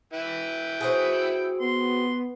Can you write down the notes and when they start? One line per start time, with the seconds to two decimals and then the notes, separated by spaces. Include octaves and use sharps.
0.13 E4 B4 G5
0.81 C4 F#4 G#4
1.61 B3 C6